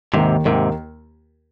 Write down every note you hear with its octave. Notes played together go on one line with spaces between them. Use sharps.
D#2 G#2 C3 D#3 A#3
D#2 G#2 C3 D#3 A#3